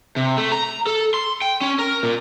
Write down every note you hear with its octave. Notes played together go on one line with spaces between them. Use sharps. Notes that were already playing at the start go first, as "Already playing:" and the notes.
C3
A3
A#5
A4
C6
G5
C#4
A#4
A#2